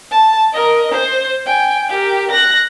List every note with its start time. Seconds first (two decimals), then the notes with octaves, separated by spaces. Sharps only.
0.11 A5
0.53 A#4 D#5
0.92 C5
1.46 G5 G#5
1.89 G4 A#4
2.31 F#6 A#6